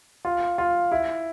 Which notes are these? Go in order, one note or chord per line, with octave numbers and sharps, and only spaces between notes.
F4
F4
E4